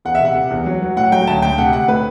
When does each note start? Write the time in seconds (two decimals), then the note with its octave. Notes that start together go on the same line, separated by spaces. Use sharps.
0.05 E2 F#5
0.15 E5
0.20 C3 F#5
0.35 C3
0.51 E2
0.66 F#3
0.81 F#3
0.96 A2 F#5
1.12 F#3 G5
1.27 D2 A5
1.42 D2 G5
1.58 C3 F#5
1.73 D2 F#5
1.88 A2 B4